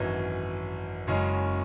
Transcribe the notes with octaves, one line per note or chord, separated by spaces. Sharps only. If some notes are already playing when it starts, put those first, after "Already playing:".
Already playing: G#1 F#2 E3
F#1 F#2 C#3 G#3 C#4